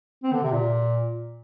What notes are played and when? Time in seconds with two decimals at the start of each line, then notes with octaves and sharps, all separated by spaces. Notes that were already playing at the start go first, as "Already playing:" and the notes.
0.24 C4
0.33 D3
0.43 C3
0.52 A#2